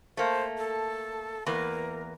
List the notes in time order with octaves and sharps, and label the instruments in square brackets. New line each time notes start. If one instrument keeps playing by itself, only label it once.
[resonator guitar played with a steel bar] A3 A#3 [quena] C5
[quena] A4
[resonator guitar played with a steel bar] E2 A#3 B4 [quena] A#4